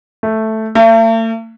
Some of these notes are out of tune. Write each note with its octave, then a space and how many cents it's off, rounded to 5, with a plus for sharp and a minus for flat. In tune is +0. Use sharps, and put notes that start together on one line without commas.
A3 +0
A3 +45